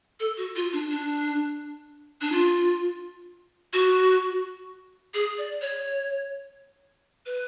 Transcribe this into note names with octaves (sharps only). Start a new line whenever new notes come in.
A4
F#4
F4
D4
D4
D4
F4
F#4
G#4
D5
C#5
B4